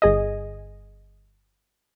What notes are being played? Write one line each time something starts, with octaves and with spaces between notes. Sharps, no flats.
G1 G#4 D#5